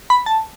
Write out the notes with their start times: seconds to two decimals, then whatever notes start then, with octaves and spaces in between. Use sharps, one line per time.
0.10 B5
0.26 A5